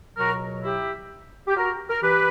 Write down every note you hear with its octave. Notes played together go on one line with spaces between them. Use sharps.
C#2 B2 F#3 F#4 A#4
E4 G4
G4
F#4 A#4
A#4
G2 E3 G4 B4